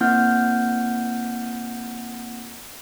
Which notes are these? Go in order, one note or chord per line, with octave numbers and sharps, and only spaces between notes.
A#3 C4 E4 F#5 F6 G6